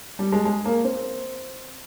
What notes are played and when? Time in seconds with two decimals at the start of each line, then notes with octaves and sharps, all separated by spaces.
0.19 G3
0.32 G#3
0.45 G#3
0.65 A#3
0.84 C4